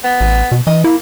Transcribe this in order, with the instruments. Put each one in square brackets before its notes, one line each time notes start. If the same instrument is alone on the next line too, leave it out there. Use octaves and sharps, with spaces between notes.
[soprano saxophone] B3
[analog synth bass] A1
B2
[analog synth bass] E3 [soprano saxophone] D#5
[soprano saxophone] A#3 [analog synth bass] E4